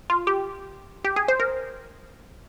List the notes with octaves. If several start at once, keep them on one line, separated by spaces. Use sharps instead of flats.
F4
G4
G4
G#4
C5
A#4